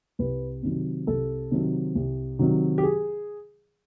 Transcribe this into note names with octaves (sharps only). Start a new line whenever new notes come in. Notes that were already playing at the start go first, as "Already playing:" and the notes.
C2 B4
C3 D#3 F#3
C2 A4
C3 D#3 F#3
C2
C3 D#3 F#3
G4
G#4